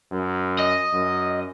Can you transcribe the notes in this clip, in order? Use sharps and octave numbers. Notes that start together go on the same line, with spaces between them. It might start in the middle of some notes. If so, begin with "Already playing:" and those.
F#2
D#5
F#2